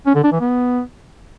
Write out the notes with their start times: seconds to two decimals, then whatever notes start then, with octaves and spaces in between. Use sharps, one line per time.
0.06 C#4
0.15 D3
0.24 D4
0.32 E3
0.41 B3